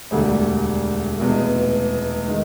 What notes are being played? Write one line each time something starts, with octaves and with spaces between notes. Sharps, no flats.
E1 D2 D3 G3
F1 E2 B2 G#3 B3
D#3 G#3